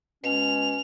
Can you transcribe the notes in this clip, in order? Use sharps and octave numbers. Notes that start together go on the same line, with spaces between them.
B2 G#3 C#4 F7